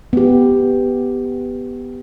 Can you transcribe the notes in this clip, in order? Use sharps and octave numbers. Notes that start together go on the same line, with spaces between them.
B3 G4